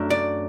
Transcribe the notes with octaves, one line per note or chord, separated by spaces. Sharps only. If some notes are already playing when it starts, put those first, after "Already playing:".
Already playing: F#2 F#3 A3 D4
D5